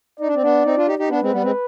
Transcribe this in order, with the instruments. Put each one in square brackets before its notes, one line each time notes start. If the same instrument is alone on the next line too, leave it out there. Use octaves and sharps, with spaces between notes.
[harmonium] D#4 [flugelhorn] D5
[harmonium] D4
C4
B3 D4
C4 D#4
D4 F4
D#4 G4
D#4 G4
[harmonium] B3 D4 [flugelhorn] B4
[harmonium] G#3 C4
G3 B3
G#3 C4